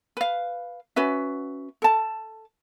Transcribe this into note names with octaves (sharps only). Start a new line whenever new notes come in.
B4 F5
C#4 F#4 B4 E5
A4 A5